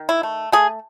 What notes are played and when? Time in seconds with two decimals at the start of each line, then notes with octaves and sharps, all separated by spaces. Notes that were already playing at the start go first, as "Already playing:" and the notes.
Already playing: D#3
0.09 E4
0.23 A3
0.52 A3 G#4